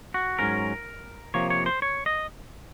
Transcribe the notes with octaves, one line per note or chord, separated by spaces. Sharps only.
F#4
G#2 F#3 C#4 A#4
C3 F3 A#3 C#5
C#5
C5
C#5
D#5